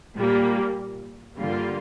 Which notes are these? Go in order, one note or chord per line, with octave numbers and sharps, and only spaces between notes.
A#2 G3 A#3
G2 D3 G3 A#3 F4